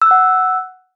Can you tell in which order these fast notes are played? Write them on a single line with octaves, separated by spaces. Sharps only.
E6 F#6 F#5